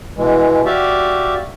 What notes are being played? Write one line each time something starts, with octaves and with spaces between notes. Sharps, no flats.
B2 E3 G#3
F#4 G4 D5 E5 F5